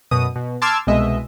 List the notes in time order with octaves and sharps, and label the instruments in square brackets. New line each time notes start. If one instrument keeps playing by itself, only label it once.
[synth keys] F#2 B2 D#6
B2
A5 C6 D6 E6 F6 G#6
C2 B2 G#3 D#5 E5